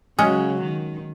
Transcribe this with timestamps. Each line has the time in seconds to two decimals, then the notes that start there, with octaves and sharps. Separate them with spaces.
0.18 C#3 F#3 G#3 C#4
0.61 D#3